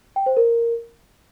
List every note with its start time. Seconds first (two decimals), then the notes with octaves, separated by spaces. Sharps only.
0.16 G5
0.26 C5
0.37 A#4